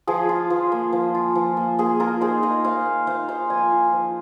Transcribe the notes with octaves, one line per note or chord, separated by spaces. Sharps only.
F3 G#4
F4
F3
A#3
F3
F4
F3
A#3
A#3 G#4
A#3 F4 A#4
D#4 G#4 C5
D#4 A#4 D#5
A#3 C5 F5
A#3
D#4 C5 F5
D#4 C5 F5
F3 D#5 G#5
F4
F3